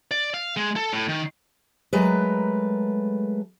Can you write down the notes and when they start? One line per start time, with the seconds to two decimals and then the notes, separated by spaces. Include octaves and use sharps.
0.11 D5
0.34 F5
0.57 G#3
0.76 A4
0.93 A2
1.09 D#3
1.93 F#3 G#3 A3 A#4 B4